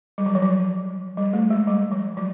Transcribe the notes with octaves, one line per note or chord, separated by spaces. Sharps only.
G3
F#3
F3
F#3
G3
A3
G#3
G3
F3
F#3